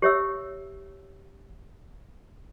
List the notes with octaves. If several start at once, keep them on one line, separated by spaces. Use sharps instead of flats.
G4 C#5 E5 E6